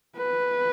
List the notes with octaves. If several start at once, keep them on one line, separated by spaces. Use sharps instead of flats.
B4